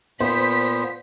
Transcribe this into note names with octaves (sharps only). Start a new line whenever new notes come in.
A#2 B3 C5 B6